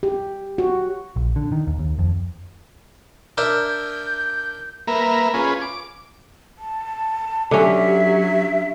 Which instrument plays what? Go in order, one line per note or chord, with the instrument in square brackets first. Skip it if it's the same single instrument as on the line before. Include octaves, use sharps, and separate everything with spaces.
[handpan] G4
F#4
[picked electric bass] A#1
D3
D#3
D#2
D#2
F2
[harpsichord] D4 A#4 E5 [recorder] G6
[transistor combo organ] A#3 A#4 B4 E5
C#4 F4 G#4 B4
D6
[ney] A5
[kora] D3 C#4 [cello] F#3 [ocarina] G4 [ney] E5